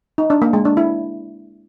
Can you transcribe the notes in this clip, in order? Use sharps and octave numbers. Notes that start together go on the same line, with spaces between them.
D#4
D4
A#3
G#3
D4
E4